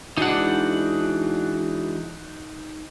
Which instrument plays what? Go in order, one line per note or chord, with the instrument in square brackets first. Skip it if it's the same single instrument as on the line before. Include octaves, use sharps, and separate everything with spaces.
[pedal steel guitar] E3 G#3 D4 [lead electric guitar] D#4 F#5 [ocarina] F#4